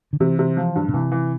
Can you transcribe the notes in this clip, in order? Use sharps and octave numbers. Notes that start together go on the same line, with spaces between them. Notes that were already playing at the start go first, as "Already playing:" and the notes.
D3
C3 E3
C3
F3
G2
B2
C3 E3
E3